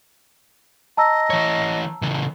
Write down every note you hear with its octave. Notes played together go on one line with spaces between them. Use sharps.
D#5 A5 A#5 E6
E3 C#5
C#3 E3